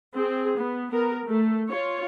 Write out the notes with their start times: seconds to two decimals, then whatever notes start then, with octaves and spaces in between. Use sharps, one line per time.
0.13 C4 G#4
0.57 B3
0.90 B3 A#4
1.24 A3
1.69 F4 C#5